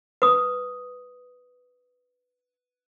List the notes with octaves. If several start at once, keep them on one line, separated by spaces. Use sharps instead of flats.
B4 D#6